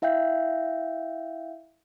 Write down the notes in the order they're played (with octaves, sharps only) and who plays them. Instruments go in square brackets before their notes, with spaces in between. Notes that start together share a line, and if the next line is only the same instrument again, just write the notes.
[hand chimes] E4 E5 F5 G5 G6